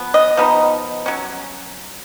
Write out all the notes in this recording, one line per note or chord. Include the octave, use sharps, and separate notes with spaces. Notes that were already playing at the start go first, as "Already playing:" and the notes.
Already playing: F3 B3
D#5
F3 B3 D#4
F#3 C#4